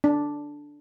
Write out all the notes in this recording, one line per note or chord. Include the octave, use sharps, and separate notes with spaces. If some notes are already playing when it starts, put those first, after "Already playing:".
D4